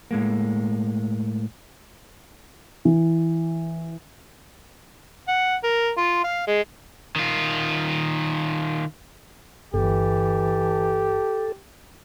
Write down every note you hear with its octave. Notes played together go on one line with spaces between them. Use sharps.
A2 G#3 A#3
E3
F#5
A#4
F4
F5
G#3
D#3 F4
G1 E3 G4 A4